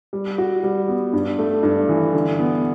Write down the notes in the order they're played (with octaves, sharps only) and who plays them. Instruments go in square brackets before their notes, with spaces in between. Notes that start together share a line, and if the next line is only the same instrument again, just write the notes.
[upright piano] G3
F#4
G3
B3
G2
A3
G2
E3
D3
B3